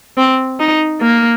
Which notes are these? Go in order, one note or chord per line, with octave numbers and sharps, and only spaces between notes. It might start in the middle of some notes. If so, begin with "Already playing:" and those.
C4
D#4
A#3